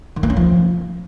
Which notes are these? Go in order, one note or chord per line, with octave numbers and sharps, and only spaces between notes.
D#3
A#3
C#4
F3